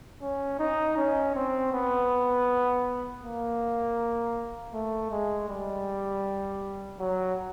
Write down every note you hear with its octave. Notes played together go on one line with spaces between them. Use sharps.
C#4
D#4
C#4
C4
B3
A#3
A3
G#3
G3
F#3